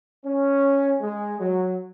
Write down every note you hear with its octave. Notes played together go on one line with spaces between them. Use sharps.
C#4
G#3
F#3